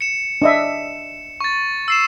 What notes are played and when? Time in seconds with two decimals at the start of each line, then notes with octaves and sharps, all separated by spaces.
0.01 C#7 E7
0.42 D4 D#5 E5
1.40 C#6 A6
1.88 E6 C7 E7